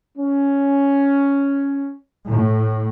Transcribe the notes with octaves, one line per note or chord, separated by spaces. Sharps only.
C#4
A2